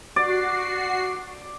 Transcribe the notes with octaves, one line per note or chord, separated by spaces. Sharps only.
F#4 D5 C7